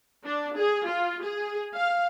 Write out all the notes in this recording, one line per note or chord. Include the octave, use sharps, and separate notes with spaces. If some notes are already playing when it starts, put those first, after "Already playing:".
D4
G#4
F4
G#4
F5